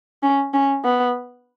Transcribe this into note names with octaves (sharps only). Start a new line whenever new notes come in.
C#4
C#4
B3